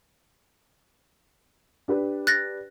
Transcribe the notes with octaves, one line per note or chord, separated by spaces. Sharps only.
D4 G4 B4
F#6 A6 A#6